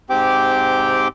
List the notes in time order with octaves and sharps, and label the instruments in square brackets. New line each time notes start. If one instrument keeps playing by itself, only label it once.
[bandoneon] G#2 C4 G4 G5 D6